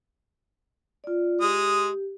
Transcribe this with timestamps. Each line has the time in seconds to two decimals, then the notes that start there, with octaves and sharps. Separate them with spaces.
1.04 F4 D5
1.41 G#3 G4 D#6